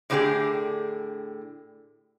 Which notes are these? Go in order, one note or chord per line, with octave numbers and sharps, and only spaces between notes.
A2 D3 A#3 C4 G4 G#4